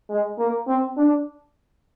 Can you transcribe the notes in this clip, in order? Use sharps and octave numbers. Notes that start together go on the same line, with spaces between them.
G#3
A#3
C4
D4